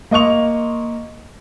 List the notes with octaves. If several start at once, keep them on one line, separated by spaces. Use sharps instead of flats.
A#3 D#5 C6 C#6 F7